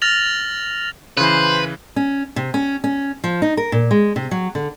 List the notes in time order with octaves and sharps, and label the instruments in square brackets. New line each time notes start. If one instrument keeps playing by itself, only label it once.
[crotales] F6 A6 A#6 F7 F#7
[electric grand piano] C#3 E3 [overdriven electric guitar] B4 [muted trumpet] C5
[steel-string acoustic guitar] C#4
C3
C#4
C#4
F3
D#4
A#4
A#2
G#3
C3
F#3
D3